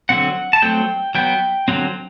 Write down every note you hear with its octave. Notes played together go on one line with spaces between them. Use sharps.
D3 F#3 C4 F#5
A5
F#3 A3 C4 G5
F#3 B3 G5
D3 F#3 C4